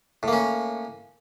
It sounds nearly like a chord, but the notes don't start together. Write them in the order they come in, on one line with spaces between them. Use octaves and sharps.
A2 A#3 C#4